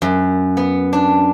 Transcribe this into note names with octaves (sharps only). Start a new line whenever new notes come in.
F#2
B3
D4